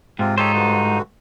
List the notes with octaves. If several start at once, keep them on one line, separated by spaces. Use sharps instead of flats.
G#2 C3 C4 F4
D#4 F4 G4 A4 C5 C#5
G2 D3 F#4